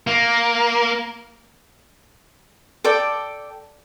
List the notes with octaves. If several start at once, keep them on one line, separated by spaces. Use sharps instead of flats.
A#3
A4 D5 G5 D6